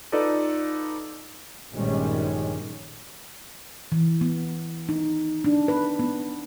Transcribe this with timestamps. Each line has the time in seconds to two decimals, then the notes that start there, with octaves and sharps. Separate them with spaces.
0.12 D#4 F4 A4 B4 D5 D#5
1.73 A#1 G2 D#3 G3 G#3 C#4
3.92 E3
4.21 B3
4.89 D#4
5.45 D4
5.68 B4
5.99 B3